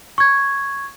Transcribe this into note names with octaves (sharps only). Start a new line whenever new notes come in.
C#6 G#6